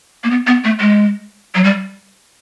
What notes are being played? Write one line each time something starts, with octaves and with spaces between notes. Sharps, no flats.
A#3
B3
B3
A3
G#3
F#3
G3